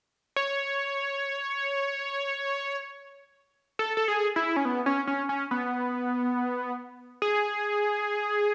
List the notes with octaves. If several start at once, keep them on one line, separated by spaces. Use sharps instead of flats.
C#5
A4
A4
G#4
E4
C#4
B3
C#4
C#4
C#4
B3
G#4